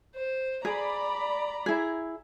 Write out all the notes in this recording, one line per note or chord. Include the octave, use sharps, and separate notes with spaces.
C5
G#4 D5 A#5 B5
E4 G#4